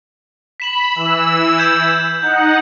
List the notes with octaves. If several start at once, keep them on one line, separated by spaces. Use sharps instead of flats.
B5 B6 E7 F#7
E3 E6 F#7
G6 G#6 E7
D#4 F#5 G6